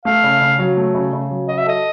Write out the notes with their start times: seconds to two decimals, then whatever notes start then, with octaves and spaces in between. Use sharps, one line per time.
0.05 A3 F5
0.24 C#3
0.41 C#3
0.59 F#3
0.77 A3
0.95 C#3
1.13 C#3
1.30 F#3
1.48 F#4 D#5
1.58 E5
1.66 A4 D#5